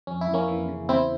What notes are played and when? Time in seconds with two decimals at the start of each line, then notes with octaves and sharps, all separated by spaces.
0.07 F2 C#4
0.21 E4
0.28 F2
0.34 A#3 C#4
0.48 E3
0.68 C#3
0.89 E2 C4 E4